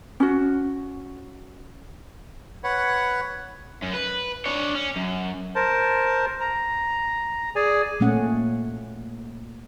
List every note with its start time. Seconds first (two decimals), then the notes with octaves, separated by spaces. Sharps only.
0.20 C#4 F#4
2.64 B4 C#5 F#5
3.82 F#2
3.93 B4
4.46 D4 C#5
4.75 C#4
4.96 F#2
5.55 A#4 C5 A5
6.40 A#5
7.55 G#4 D5 G#5
8.00 A#2 A3 A#3 C#4 F#5